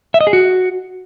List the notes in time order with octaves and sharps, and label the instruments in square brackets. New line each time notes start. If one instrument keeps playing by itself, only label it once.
[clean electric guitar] E5
D#5
G#4
F#4